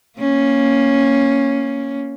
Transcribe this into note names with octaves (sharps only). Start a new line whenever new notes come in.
A#3 C#4